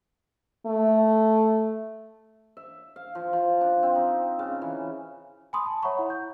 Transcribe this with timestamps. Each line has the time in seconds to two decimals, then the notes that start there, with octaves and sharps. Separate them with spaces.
0.67 A3
2.57 E5
2.96 F5
3.15 F3
3.33 F3
3.61 D4
3.83 C4
3.95 D#4
4.39 C#3
4.62 E3
5.53 G#5 B5 C6 D#6
5.66 A5
5.83 C#5 E5 F#5 A#5 B5 C#6
5.98 E4 F#5
6.10 G6